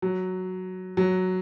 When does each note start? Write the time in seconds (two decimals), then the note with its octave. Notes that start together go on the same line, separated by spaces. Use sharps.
0.02 F#3
0.97 F#3